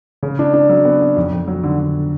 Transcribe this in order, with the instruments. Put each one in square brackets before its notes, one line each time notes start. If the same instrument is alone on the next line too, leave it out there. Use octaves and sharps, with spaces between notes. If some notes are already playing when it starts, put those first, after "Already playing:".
[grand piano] C#3
D4
D4
F#3
B3
B3
F2
F2
F#3
D3
D3